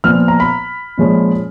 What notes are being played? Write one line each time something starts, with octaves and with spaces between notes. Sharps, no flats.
A#2 F3 B3 F6
A#5
B5
A#2 F3 G#3 C#4